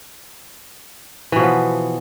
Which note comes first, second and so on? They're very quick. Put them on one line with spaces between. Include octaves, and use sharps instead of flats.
E3 B2 F3 B3